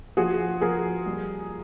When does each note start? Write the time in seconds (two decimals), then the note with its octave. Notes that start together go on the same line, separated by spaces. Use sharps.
0.17 F3 F#4 G#4
0.61 F3 G#4 A#4
1.06 G3